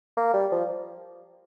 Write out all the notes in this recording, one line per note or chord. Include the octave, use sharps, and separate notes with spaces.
A#3
G3
F3